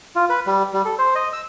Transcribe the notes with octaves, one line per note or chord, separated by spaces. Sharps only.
F4
B4
G3
G3
A4
C5
D#5
E6